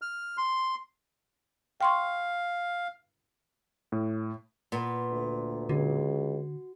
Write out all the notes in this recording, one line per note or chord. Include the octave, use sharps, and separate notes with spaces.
F6
C6
F5 G5 C6 C#6
A2
A#2 B3
D2
C#2 D3 F#4